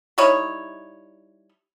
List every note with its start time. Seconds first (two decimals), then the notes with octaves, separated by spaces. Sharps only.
0.18 G3 D#4 E4 C#5